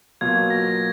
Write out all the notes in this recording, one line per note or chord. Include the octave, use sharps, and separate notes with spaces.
B2 F#3 A#3 F4 G#6
A#6